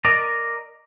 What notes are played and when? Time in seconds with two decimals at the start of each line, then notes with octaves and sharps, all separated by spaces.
0.05 A#4 D5 D#5 A#5